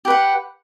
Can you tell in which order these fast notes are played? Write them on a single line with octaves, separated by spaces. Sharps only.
G4 B4 F#5